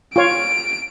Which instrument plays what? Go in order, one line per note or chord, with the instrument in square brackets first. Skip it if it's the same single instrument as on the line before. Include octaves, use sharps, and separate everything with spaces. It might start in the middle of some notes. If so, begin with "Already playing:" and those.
[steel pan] F4 C#5 [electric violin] D7